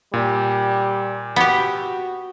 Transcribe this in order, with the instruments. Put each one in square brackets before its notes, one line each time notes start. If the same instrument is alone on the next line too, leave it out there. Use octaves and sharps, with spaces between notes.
[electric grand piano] A#2 [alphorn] G3
[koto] B3 G4 [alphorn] F#4